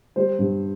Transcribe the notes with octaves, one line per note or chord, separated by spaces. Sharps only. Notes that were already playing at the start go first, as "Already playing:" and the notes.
G3 C5
G2